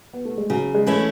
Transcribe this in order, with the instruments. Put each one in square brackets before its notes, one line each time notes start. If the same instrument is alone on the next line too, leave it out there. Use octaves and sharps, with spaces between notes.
[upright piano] B3
A3
G#3
[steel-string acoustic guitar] C#3 [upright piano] F#3
[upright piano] G#3
[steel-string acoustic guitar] E3 A3 C#4 E4